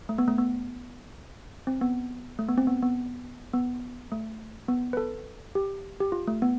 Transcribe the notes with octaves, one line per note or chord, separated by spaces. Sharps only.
A3
B3
A3
B3
C4
B3
A3
B3
C4
B3
B3
B3
A3
B3
B4
A4
G4
G4
F4
A3
B3